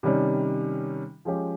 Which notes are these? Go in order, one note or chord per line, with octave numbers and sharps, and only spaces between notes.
C3 D#3 G3 C#4
F3 G#3 C#4 G4